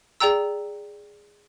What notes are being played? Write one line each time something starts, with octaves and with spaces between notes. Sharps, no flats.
G#4 D5 G5 A#5 E6